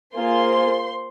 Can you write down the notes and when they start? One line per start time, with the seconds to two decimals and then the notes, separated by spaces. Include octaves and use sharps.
0.15 A#3 F4 G#4 C5 C6